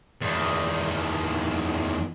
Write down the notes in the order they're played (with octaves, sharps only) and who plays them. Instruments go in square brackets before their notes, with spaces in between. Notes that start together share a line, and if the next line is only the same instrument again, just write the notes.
[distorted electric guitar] E2 D#3